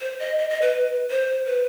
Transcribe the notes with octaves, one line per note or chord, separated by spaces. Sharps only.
C5
D#5
D#5
D#5
B4
C5
B4